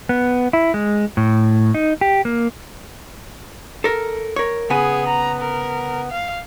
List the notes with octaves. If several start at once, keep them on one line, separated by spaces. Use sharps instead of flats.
B3
E4
G#3
A2
D#4
G4
A#3
A4 A#4
A#4 C#5
C#3 B3 G#4 G#5
A#5
A#4
F5